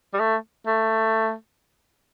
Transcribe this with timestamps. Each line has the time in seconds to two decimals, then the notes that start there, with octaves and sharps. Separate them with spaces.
0.14 G3
0.19 A3
0.67 A3